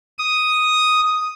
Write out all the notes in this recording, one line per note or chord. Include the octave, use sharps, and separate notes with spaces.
D#6